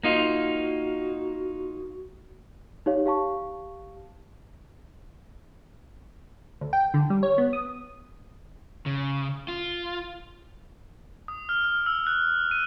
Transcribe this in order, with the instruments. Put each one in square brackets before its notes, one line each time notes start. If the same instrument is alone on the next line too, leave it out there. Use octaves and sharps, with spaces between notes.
[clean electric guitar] A#3 D#4 F4 [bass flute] F#4
[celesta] D#4 G4 C#5 F5
G4 F5 A5 C#6
[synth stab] D2
G5
D3
G3
C#5
B3
D#6
[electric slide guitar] C#3
F4
[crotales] D#6
F6
F6
E6
F#6
D#7